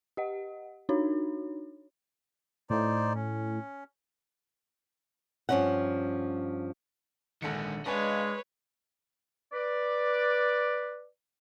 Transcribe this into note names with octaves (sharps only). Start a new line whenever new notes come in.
G4 D#5 F#5
D4 D#4 F#4 C#5
A2 D#4 C5 D5
C#4
G2 F3 A#3 C#4 D#4 F#5
A#1 D3 D#3 G#3 C#7
G#3 D4 B4 C#5 D#5 F5 G#5
B4 D5